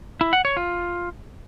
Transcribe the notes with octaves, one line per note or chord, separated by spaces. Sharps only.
E4
F#5
C#5
F4